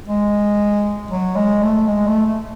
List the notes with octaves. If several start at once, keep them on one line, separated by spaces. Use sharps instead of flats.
G#3
F#3
G#3
A3
G#3
A3
A3